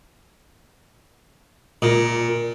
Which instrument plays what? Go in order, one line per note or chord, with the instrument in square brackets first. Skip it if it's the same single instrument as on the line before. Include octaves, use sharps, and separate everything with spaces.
[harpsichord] A#2